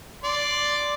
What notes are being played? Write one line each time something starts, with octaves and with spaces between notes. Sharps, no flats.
D5 C6